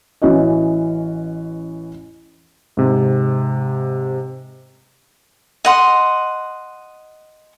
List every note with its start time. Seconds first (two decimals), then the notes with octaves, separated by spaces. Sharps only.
0.22 A1 E3 C#4 F#4 D#5
2.77 G#2 C3
5.65 D#5 F#5 C6